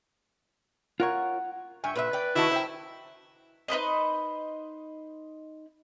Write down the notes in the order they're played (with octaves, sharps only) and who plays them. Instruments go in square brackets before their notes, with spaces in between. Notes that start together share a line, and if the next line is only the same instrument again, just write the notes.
[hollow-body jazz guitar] F4 A#4 C#5 [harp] F#5
[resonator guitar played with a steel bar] G2 G#5 [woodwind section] E5 G5 C#6
[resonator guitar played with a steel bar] A#2 C5 E5 [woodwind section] B4
[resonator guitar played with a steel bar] D5 G5
[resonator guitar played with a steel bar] D#3 F#4 A5 [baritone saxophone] E4
[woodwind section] D#3 F#3 E5 [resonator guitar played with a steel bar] C5 G5
[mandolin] D#4 B4 C5 D#5